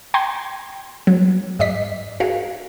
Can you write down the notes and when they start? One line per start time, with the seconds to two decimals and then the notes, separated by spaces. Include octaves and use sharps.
0.14 G5 G#5 A#5 C6 G#6
1.07 F#3
1.59 G#2 D5 D#5 B6
2.20 F#4 G#4 A#4 F5